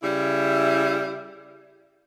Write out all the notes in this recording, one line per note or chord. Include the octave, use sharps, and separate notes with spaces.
C#3 G3 E4